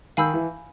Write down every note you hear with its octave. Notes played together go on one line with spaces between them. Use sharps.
D#3 F5 G#5 B5 E6 G6
E3